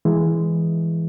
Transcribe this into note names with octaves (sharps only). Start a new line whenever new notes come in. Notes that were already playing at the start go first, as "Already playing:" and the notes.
E3 G#3